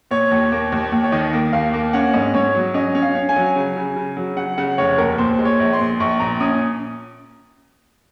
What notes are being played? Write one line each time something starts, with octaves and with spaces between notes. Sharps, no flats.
A#2 C#5
D#2
A#3
D#2
D#2
C#5
D#3 D#5
A#3
D#2 F5
A#3
C#4 F#5
G#2 D#5
G#2 C#5
F#3
C#4 D#5
C#4
F5
C#4
G#5
F#3
C#3
C#3
C#3
F#3
C#3 F#5
C#3 F#5
F1 C#5
D#2 A#4
A#2 C5
G#3
C#5
A#1
C6
A#2
A#1 C#6
A#2 A#5
C#4 D#6